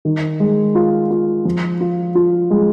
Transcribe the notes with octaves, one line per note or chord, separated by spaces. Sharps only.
D#3
G#3
F4
F4
F3
F4
F4
G#3